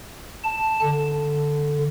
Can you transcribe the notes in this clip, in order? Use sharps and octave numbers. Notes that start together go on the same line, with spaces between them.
A5
D3